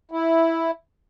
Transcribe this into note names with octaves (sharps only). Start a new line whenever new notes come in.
E4